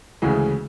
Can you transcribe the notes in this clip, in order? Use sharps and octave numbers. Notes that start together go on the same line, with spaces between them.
D2 C#3 E3 G#3